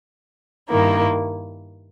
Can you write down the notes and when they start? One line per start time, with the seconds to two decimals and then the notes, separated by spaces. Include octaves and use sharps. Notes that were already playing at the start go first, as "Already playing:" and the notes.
0.69 G2 D#3 A#3 E4